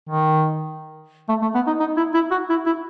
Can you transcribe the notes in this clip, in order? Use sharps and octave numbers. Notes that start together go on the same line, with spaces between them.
D#3
A3
A3
B3
D#4
D#4
E4
E4
F#4
E4
E4